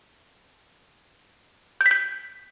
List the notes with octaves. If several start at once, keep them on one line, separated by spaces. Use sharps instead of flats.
G6
B6
G6